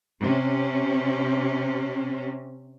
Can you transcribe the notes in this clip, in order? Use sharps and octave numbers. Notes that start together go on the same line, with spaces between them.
C3 C4 C#4